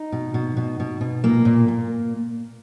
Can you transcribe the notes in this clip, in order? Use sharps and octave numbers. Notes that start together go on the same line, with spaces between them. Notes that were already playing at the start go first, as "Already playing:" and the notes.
Already playing: D#4
B2
B2
B2
B2
B2
A#2 A#3
A#2
A#2